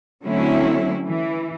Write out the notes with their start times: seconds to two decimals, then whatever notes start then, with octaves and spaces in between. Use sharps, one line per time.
0.23 D3 F#3 A3 C4 C#4 E4
1.05 E3